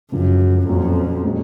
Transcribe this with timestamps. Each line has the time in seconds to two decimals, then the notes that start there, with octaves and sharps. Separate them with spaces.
0.12 C#2 F#2 C#3 F3
0.67 F2 A#2 F#3 C#4 F4
1.24 A#2 G#3 C#4